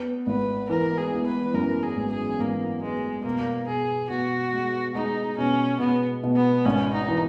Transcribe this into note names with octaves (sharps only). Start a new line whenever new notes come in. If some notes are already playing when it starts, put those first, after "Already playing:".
Already playing: B3
G#1 B4
E3 A#4
G#4
B3
B4
F#2 A#4
G#4
G#1
G#4
G#1 A#3
G#3 B3
B2 A#3
B2 G#4
B2 F#4
G#3
G#3 D#4
B2 C#4
B2 B3
B2
B3
G#1 C#4
D#4
E3